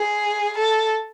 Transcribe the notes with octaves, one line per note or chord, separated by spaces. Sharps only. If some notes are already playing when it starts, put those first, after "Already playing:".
Already playing: G#4
A4